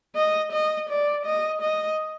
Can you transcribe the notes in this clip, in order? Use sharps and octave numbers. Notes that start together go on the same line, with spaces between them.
D#5
D#5
D5
D#5
D#5